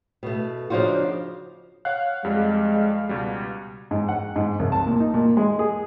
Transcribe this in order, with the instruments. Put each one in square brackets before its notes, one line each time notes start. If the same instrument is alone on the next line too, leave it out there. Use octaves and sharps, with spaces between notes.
[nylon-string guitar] B2 A3
C#3 F3 D4 D#4 F4 F#4
[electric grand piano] C#5 F#5 F#6 [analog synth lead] F5
[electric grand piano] F2 G3 [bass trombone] G#3
[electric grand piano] C#2 B2 G3
[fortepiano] G#2
F#5
G#2
C2
A5
A#2
D#4
A#2
G#3
G#4